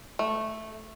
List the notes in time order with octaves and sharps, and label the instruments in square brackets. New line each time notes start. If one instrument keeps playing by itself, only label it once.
[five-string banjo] A3